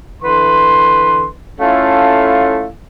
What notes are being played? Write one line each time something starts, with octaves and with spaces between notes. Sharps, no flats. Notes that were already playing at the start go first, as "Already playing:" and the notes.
D3 E3 B4 C6
A3 C#4 E4 F4 A4 F5